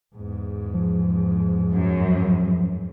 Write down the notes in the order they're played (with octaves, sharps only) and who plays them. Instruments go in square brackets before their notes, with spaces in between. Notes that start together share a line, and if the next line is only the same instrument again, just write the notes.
[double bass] E2 G#2
[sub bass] F3
[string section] F#2